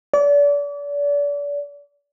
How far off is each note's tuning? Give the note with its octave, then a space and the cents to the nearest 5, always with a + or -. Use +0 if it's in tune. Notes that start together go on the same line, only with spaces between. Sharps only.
D5 -35